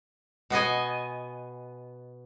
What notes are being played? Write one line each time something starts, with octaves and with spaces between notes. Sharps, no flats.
B2 B3 D#5 G#5